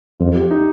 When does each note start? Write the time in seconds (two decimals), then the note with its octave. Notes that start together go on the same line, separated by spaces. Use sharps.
0.20 F2 F4
0.35 G4
0.51 D#4